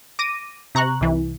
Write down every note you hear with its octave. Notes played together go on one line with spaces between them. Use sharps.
D6 A#6 D#7
C3 A#5 C#6 F#6
C2 E3